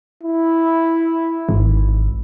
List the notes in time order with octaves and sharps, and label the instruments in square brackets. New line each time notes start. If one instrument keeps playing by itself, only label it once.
[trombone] E4
[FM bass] G#1